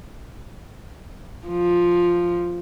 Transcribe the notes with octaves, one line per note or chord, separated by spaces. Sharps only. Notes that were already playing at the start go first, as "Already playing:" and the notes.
F3